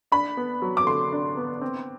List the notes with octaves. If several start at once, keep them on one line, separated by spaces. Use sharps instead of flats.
D4 B5
B3
F#3
D6
D3 C6
D4
B3
C4